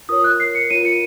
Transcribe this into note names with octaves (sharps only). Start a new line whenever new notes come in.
F4 A#4 C#5 D#6
F#6
C7
C#7
F4 A#4 C#5 D#7
C#7